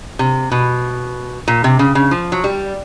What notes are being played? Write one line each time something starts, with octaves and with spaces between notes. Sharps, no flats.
C3
B2
A#2
C3
C#3
C#3
F3
F#3
G3